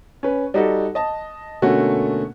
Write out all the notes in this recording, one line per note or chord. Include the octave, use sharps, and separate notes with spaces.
C#4 B4
G3 D#4 F#4 A4
D#5 A5
B2 D3 A3 A#3 C#4 F#4